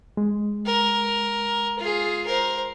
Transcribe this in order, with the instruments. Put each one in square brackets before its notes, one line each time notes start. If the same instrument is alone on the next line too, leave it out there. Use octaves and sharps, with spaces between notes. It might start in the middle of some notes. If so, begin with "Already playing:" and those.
[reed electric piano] G#3
[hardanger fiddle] A#4
F4 G#4
A#4 C5